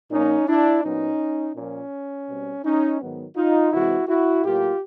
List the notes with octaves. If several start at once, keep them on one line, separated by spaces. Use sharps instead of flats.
A#2 F3 A#3 C#4 D#4
D4 E4
A#2 F#3 B3 C#4 D#4
A#2 F3 A#3 C#4
B2 G3 C4
C#4 D#4
G#2 D#3 F#3 B3
D#4 F4
C3 E3 G#3 C4 E4 F#4
E4 F#4
A2 F#3 A#3 F4 G4